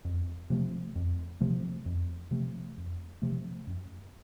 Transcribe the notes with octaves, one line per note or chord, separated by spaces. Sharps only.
F2
C3 F3 A3
F2
C3 F3 A3
F2
C3 F3 A3
F2
C3 F3 A3
F#2